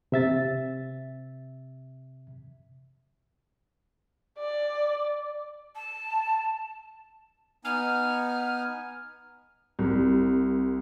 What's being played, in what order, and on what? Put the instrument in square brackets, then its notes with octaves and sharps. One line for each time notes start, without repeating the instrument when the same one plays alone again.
[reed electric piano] C3 E5 A6
[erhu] D5
[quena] A5
[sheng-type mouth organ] B3 D#4 G#5 [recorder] F6
[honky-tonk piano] C2